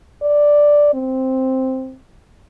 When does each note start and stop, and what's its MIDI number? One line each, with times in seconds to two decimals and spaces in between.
0.22 0.90 74
0.94 1.96 60